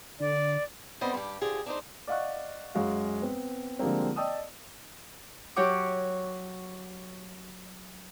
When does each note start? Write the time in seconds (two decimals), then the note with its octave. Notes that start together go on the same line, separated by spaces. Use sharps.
0.20 D3 D5
1.01 G3 B3 C4 D4 C5 D#5
1.14 G2 G4
1.41 D3 F3 G4 G#4
1.66 D4 D#4 C5
2.07 D5 D#5 F5 F#5 C#6 F#6
2.75 F#2 G#3 F#4 F5
3.22 B3 C4
3.79 D3 F3 G3 G#3 A#3 C4
4.16 D5 D#5 G5 A5 D#6 E6
5.56 F#3 G4 C#5 F#5 D6